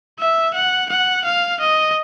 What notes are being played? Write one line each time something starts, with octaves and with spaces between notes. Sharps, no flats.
E5
F#5
F#5
F5
D#5